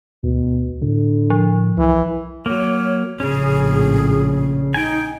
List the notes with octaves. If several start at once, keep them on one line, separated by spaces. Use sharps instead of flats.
D2 B2
A2 D3
F3
C2 E3
F#3 A#3 C#5
A#1 A2 C#3 C#4 G#4
D#4 G5 G#5